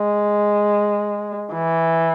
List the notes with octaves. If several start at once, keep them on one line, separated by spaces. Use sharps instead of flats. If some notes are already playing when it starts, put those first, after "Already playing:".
Already playing: G#3
E3